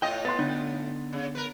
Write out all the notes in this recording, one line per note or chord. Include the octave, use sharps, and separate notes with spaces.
A2 F4 D#5 G5
B3 C6 A6
D3 B3 D#4
C#3
A#4 B4